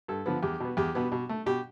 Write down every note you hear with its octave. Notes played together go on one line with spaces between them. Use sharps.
G2 A4
D3 F3 B3
E2 G4
B2 B3
E2 G4
B2 B3
B2
A3
B2 G4